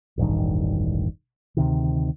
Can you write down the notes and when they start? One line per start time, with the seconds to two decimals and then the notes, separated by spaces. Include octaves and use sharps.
0.18 E1 A1 G2 D#3
1.57 D2 C3 D#3